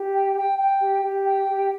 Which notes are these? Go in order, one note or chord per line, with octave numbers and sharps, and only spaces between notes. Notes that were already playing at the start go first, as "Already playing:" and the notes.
Already playing: G4
G5
G5
G5
G4
G4
G5
G4